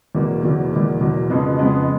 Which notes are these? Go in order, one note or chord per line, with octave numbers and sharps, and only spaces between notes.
E2 B2 F#3 A#3
E2 B2 F#3 A#3
E2 B2 F#3 A#3
E2 B2 F#3 A#3
F2 C#3 F3 G#3 B3
F2 C#3 F3 G#3 B3